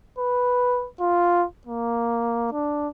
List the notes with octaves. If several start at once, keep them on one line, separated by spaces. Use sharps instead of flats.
B4
F4
A#3
D4